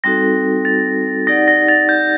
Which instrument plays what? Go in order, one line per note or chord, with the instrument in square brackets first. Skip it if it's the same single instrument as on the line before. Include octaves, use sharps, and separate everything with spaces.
[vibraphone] G3 C4 D#4 F#4 A4 [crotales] A#6
[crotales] A6
[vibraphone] D#4 G4 D5 F#5 [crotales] A#6
[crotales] A#6
A6
G6